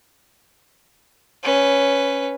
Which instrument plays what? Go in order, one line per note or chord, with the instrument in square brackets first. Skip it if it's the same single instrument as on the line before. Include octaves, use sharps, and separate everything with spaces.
[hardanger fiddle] C#4 B4